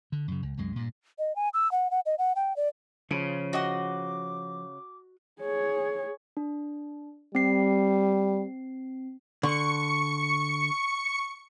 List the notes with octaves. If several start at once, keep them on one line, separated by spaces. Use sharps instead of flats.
D3
F#2 C#3
C#2
C2 F#2 G#3
G2 A#2
D#5
G#5
E6
F#5
F#5
D#5
F#5
G5
D5
C#3 F3 F4
F#4 D#5 F#5 D6
G#4 C#5
D4
G3 C4 C7
D3 C#6 C#7